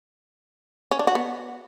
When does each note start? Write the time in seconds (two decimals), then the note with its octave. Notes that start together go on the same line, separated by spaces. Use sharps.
0.91 C#4
0.99 D4
1.07 F#4
1.15 B3